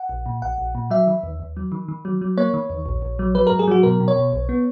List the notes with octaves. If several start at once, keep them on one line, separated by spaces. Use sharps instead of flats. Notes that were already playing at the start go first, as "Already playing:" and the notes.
Already playing: F#5
A#1
A#2
A#1 F#5
A#1
A#2
F#3 E5
D#3
D#2
D#2
F#3
D#3
D#3
F#3
F#3
A#3 C#5
D#3
D#2
A#1
A#1
F#3
F#3 B4
G#2 A#4
G#4
F#3 F#4
B2 A#4
B2
C#5
B2
B1
B3